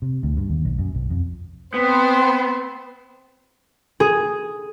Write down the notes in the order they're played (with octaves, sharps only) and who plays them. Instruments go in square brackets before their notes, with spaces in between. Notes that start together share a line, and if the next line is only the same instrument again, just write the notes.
[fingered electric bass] C3
D2
G2
D#2
B1
F#2
B1
F2
[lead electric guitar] B3 [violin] C4 C5
[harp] G#4